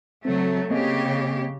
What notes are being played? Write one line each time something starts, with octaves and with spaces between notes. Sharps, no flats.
C#3 F#3 A3 C4
C#3 A#3 C4 G4 D#5